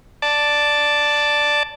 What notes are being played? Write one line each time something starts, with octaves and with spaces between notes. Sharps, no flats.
D5 A5